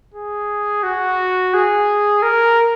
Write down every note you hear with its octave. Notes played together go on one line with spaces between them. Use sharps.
G#4
F#4
G#4
A#4